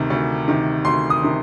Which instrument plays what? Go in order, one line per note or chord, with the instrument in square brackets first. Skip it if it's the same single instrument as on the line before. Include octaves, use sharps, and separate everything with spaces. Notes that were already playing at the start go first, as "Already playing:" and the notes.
Already playing: [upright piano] D2 C3 D#3
D2
C3 D#3
D2 C6
D#6
C3 D#3